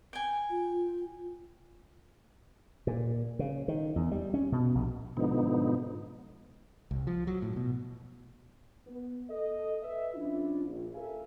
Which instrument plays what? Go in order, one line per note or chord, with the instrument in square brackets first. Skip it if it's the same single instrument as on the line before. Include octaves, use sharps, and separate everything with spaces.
[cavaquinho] G5 G#5
[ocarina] F4
[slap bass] A#2
C#3
D#3
E2
G3
C#4
B2
A#1
[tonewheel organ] G#2 B2 D3 F3 B3 D#4
[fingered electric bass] C2
F3
F#3
A2
B2
[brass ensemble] B3
A4 D#5
B4 E5
F3 C#4 D4 E4 F4
A#1
G4 A4 A#4 E5 F5 G#5